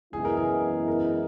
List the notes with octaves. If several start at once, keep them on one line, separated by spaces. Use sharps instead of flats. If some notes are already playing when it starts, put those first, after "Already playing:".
F#2 E3 G#3 B3 E4 G#4
A#4
G#4
A#4